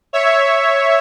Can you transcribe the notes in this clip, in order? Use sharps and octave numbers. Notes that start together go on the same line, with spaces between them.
C#5 E5